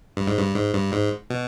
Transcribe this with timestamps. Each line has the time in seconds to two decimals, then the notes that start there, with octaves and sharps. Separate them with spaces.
0.17 G2
0.27 G#2
0.38 G2
0.54 G#2
0.73 G2
0.92 G#2
1.30 B2